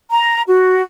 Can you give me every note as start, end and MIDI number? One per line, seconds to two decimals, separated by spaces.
0.11 0.42 82
0.47 0.82 66